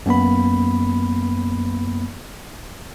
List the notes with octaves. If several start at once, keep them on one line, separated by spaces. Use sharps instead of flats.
F#2 A#3 B3 B5